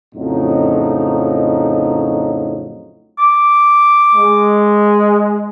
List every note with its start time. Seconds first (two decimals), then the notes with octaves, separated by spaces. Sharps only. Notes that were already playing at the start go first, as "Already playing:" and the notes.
0.15 F2 A2 C#3 F3 F#3 D#4
3.19 D6
4.15 G#3